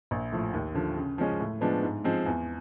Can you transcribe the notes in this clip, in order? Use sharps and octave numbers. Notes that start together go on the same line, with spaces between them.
A#1
A2 F3
D#2
D3 F3
C#3
F3 G#3 C#4
A2
F3 G#3 B3 D4
G#2
F3 G#3 C4
E2